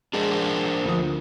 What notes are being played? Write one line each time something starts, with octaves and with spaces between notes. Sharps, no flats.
G#3 D4 A#4 C5
D2 F3 D#6